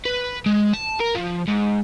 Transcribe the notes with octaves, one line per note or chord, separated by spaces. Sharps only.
B4
G#3
A5
A#4
F3
G#2